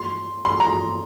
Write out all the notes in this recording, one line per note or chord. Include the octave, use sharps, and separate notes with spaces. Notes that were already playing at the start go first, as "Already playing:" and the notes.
Already playing: C6
C6
A#5